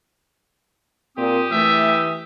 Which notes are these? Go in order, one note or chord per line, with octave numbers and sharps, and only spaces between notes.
A#2 C4 G4 D#6
E3 A3 E5